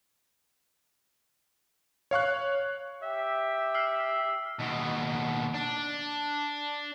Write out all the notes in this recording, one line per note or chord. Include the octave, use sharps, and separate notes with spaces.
C#5 F5 C#6 F#6
G4 E5
E6 F6 C7
D#2 B2
D4